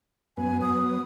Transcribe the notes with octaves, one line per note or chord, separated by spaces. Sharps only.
F#2 B3 G#5
F#3 B3 D#6